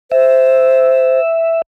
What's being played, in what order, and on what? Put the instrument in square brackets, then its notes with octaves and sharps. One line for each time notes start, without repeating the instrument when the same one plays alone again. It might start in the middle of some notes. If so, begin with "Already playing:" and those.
[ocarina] C5 [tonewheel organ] E5